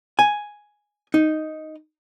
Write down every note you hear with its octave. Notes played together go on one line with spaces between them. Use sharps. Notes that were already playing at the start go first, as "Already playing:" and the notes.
G#5
D#4